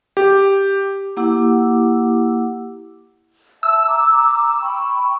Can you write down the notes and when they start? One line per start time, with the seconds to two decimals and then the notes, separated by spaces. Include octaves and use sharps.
0.17 G4
1.17 A#3 E4 G4 F#5 D6 E6
3.63 E5 A5 E6
3.87 A#5 D6
4.61 G5 B5 C#6